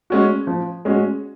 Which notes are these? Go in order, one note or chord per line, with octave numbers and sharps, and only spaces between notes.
G#3 C#4 F#4
F3
G#3 C#4 F#4